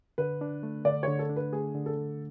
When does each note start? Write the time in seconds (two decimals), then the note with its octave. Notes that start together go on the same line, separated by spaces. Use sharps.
0.18 D3 B4
0.41 D4
0.63 A3
0.85 D3 D5
1.03 D3 C#5
1.19 A4
1.30 D4
1.36 B4
1.53 A3 G#4
1.75 D3
1.86 A4
1.97 D3